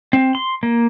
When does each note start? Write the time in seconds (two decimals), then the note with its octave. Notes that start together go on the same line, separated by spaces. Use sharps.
0.13 C4
0.35 C6
0.63 A#3